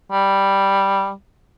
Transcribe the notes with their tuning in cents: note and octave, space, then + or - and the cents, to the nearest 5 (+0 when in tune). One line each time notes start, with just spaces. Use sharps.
G3 +0